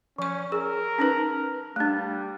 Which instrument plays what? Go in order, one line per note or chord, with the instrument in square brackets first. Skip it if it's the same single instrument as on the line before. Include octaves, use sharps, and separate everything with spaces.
[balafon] F3 C#6 [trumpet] C#4
[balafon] G#4 [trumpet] A#4
[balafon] C#4 D#4 B4
[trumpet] G3 [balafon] A3 D4